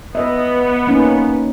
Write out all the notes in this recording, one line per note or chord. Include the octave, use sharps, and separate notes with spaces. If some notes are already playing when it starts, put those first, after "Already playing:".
B3 B4 D#5 E5
A#3 C#4 D#4